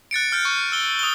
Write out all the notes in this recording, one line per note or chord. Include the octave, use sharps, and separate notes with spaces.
F#6 A6 C#7 D7
F6 G6 C#7
C#6
E6 G7
D#6 G7